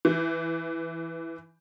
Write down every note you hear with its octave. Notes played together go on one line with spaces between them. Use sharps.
E3 G6